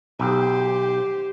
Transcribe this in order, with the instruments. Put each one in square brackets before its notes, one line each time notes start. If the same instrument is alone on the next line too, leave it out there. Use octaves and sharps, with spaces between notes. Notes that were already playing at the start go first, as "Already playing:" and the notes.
[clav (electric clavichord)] B1 [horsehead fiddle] G4 C5